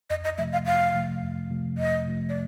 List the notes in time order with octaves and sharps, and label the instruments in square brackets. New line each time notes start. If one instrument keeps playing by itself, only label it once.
[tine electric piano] F2 [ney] D#5
[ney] D#5
[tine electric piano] C3 F3 A3 [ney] E5
[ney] F5
[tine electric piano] F2 [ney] F5
[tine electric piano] C3 F3 A3
F2
C3 F3 A3
[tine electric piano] F2 [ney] D#5
[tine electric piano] C3 F3 A3
[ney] D5